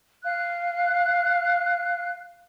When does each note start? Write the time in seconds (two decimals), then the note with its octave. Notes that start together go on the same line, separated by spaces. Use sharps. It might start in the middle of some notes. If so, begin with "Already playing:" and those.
0.23 F5 F#6